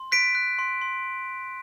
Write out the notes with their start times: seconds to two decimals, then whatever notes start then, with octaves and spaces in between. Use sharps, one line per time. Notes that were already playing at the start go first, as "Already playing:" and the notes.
Already playing: C6
0.12 F#6 B6 D7
0.35 F#6
0.59 C6
0.81 C6